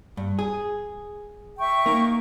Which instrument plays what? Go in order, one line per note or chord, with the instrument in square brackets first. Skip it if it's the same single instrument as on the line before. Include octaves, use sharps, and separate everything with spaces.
[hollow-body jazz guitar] G2
G#4
[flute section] E5 G5 C#6
[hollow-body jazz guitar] A#3 D#4